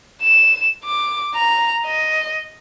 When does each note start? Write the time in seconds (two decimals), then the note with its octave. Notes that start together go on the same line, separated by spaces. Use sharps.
0.23 E7
0.84 D6
1.35 A#5
1.86 D#5